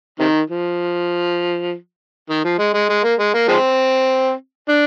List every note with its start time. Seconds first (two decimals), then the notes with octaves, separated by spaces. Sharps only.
0.19 C3 D#3
0.50 F3
2.29 D#3
2.44 F3
2.58 G#3
2.74 G#3
2.89 G#3
3.03 A#3
3.19 G#3
3.34 A#3
3.48 F3 G#3 C4
4.69 D4